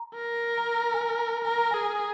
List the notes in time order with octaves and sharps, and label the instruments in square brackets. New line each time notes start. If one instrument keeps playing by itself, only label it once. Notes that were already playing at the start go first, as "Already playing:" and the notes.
Already playing: [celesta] A#5
[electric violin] A#4
[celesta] A#5
G#5
A#5
[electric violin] A#4 [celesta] G#5
[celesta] A#5
[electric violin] G#4 [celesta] G#5